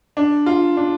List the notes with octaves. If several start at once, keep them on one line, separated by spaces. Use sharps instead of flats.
D4
F4
D4